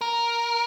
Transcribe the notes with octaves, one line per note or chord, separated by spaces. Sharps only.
A#4